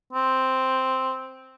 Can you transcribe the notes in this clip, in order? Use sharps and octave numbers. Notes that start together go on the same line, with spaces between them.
C4